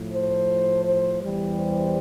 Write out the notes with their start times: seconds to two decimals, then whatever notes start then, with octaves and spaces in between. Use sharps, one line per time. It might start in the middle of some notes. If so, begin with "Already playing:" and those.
Already playing: A2 F3
0.12 C5
0.85 C5
1.22 E2 E3 G3
1.59 C5